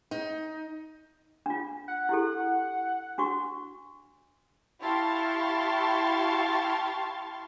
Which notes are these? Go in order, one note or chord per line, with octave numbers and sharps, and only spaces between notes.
D#4
D4 F4
F#5
E4 G4 A4
D4 F#4 C#6
E4 G4 F5 A5 C6 C#6